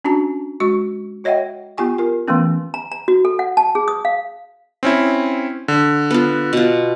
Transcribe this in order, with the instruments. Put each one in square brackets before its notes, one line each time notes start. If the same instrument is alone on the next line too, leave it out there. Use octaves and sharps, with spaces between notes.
[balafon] C#4 D4 F#4 A5 A#5
G#3 F#4 C#6
F#4 C#5 D#5 E5 F#5 G5
B3 F4 G4 G#5 C#6
F4 A#4
E3 A3 B3 C#4
[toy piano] A#5
A#5
F#4
A4
F#5
A5
G#4
D#6
F5
[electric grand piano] C4 C#4 E4
D3
[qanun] B3 F4
B2 F4